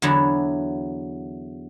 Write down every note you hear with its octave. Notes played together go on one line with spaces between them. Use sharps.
E2 D3 F#3 E4